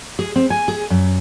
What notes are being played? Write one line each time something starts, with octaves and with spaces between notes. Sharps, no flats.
G#4
C4
G#5
G#4
F#2